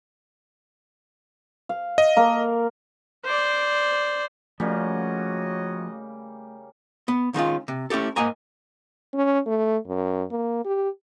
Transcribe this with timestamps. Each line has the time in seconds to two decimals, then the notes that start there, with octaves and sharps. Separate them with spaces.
1.69 F5
1.98 D#5
2.17 A#3 A#4
3.25 C5 D5
4.60 C#3 F3 G3 A3 A#3 F#4 C#5 D#5
7.08 B3
7.34 D#3 G#3 C#4 F4
7.68 C3
7.90 A3 C#4 E4 G4 A4
8.16 G#2 A#3 D#5 G#5 A#5
9.14 C#4
9.46 A3
9.87 F#2
10.31 A#3
10.65 G4